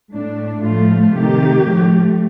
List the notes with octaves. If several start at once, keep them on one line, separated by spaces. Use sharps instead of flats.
A2 A3 D4
A2 F3 A3 F4
C3 D#3 A3 G4
A2 F3 A3